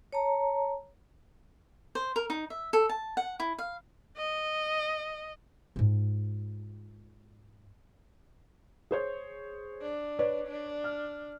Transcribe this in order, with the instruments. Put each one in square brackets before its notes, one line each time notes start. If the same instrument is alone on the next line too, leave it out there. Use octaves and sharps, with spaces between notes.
[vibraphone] C#5 A5 A#5
[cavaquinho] C5
A#4
D#4
E5
A4
A5
F#5
E4
F5
[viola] D#5
[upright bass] G#2 F4
[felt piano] G#4 C5 C#5
[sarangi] D4
[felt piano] B4 C#5 D5
[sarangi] D4
[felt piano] F6